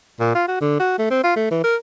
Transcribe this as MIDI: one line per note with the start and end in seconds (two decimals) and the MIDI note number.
0.20 0.33 46
0.35 0.44 65
0.48 0.58 66
0.61 0.75 50
0.80 0.98 66
0.98 1.10 57
1.10 1.20 60
1.24 1.35 65
1.36 1.51 57
1.51 1.60 52
1.64 1.76 70